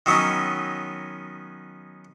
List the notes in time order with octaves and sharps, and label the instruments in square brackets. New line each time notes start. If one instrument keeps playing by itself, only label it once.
[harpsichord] D#3 F#3 B3 C#4 D#4